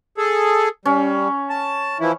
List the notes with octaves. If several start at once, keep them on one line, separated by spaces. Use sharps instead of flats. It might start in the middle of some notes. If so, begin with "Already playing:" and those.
G#4 A4
G3 C#4
A5
E3 F3 E4